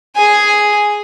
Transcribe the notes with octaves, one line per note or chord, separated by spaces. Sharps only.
G#4 G#5